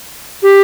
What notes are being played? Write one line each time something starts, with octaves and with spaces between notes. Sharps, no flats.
G4